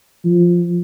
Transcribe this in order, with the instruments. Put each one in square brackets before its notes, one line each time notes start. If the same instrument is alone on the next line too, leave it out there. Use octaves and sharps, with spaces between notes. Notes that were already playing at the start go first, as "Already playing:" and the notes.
[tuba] F3